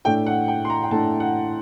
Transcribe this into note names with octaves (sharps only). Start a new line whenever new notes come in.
A2 A3 D4 G5
F#5
G5
C6
A#5
G5
A2 A3 D4 A5
F#5